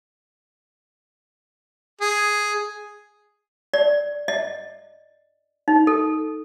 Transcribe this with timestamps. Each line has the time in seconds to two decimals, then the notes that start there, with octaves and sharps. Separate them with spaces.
2.02 G#4
3.73 D5
4.28 D#5
5.68 D#4
5.87 A4